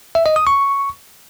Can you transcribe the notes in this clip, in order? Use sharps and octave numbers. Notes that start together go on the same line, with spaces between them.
E5
D#5
D#6
C#6